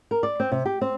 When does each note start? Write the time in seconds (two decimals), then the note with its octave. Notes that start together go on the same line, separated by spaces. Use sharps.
0.11 A#4
0.23 D5
0.40 C4
0.52 C3
0.66 G4
0.81 C4